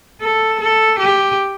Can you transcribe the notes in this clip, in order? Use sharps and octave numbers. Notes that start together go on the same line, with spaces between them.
A4
A4
G4